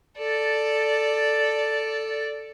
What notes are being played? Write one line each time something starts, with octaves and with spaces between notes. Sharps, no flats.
A4 D5